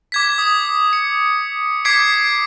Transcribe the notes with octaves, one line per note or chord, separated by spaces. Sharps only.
D6 G#6 B6
D#6
C#7
D6 G#6 B6 C7 D7